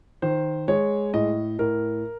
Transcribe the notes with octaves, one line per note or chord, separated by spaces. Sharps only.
D#3 C5
G#3 C#5
A2 D#5
A2 A#4